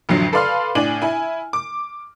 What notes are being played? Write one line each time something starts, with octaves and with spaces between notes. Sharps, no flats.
A1 F2 D3 F#3 C7
A4 B4 D5 F5 C6 F6
A2 D4 D5 G#5 D#7 F#7
E4 G#5
D6